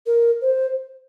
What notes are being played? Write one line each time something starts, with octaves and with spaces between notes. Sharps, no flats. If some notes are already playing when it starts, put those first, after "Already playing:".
A#4
C5